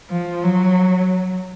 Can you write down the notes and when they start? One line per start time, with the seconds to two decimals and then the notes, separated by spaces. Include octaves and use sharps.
0.10 F3
0.43 F#3